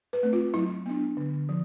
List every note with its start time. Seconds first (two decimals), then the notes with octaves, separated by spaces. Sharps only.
0.13 B4
0.23 A3 C4
0.33 F4
0.54 F#3 E4
0.86 B3 D4
1.17 D3
1.49 F3